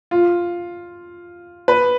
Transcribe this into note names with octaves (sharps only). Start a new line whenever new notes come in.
F4
B4